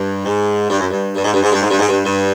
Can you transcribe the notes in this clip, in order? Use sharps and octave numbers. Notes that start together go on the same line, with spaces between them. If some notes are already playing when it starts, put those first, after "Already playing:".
Already playing: G2
G#2
G2
F#2
G2
G2
G#2
G2
G#2
G2
G#2
G2
G#2
G2
G2